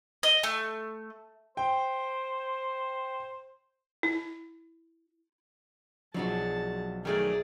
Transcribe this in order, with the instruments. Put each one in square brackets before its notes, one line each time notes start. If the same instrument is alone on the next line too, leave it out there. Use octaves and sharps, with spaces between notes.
[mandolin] D#5
A3
[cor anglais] C5 [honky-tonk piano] G5
[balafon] E4
[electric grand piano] B1 F3 [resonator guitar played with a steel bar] F#3 D4 F#4 [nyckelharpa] G#4 A5
[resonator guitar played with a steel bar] D#3 F#3 A3 [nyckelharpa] G#4 D5